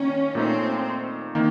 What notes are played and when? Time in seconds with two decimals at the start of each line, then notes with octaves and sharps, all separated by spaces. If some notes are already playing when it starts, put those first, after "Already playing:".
Already playing: D#3 A#3 C#4
0.35 A#2 A3 C4 D#4
1.35 D#3 A#3